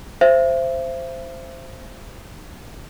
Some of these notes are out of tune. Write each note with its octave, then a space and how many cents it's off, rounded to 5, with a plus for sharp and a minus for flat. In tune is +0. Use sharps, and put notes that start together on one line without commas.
C5 +0 E5 +35